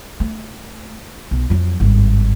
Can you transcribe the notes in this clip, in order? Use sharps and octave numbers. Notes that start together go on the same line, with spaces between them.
A3
B1
F2 F#3
G#1 G2